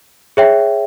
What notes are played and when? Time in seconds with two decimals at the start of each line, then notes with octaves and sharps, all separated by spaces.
0.37 G#4 C#5 E5 G5